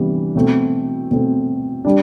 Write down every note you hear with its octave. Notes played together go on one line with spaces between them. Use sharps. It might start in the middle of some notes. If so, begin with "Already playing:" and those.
Already playing: C3 E3 G3 B3 D4
B2 A3 C4
B2 A3 C4
G3 D4